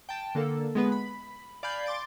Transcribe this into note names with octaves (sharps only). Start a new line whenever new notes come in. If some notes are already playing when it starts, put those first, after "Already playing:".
G5 A5
D3 A#3 A4
G#3 B3 B4
B5
D5 F5 G#5 B5 G6 C7
C6 D6 A6 D7